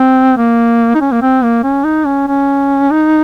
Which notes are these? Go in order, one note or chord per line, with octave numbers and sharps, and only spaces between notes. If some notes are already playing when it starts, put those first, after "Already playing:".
Already playing: C4
A#3
D#4
C#4
A#3
C4
A#3
C#4
D#4
C#4
C#4
D#4